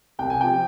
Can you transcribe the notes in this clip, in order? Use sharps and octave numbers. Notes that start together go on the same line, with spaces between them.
C2 G5
G#5
C3 F3 G5